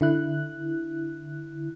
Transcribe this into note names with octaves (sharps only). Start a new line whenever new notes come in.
D3 E4 F#6